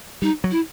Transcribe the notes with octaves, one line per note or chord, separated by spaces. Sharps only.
G3 D#4
F#3
E4